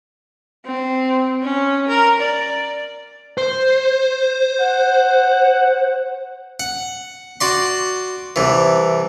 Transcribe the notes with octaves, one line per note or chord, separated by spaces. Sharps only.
C4
C#4
A#4
D5
C5
F#5
F#5
F#4 D5 C6
C2 E3